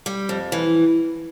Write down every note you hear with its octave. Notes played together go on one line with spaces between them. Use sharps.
G3
F2
E3